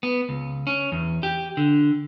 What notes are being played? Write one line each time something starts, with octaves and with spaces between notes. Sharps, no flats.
B3
C#2
C#4
E2
G4
D3